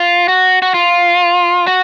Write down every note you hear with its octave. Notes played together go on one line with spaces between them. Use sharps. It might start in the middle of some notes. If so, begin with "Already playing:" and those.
Already playing: F4
F#4
F#4
F4
F#4